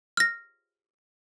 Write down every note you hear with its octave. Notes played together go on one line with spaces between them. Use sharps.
F6 A#6